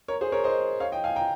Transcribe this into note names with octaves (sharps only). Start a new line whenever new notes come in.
A#4 C#5
G#4 C5
A#4 C#5
C5 D#5
C#5 F5
D#5 G5
F5 G#5
G5 A#5